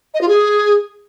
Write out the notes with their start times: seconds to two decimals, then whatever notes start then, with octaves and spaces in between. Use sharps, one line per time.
0.14 D#5
0.21 F4
0.28 G#4